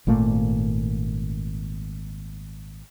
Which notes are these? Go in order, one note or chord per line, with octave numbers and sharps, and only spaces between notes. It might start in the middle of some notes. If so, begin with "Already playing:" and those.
G#1 A#2 A3 A#3